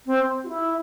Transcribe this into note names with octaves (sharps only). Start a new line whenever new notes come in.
C4
F#4
E4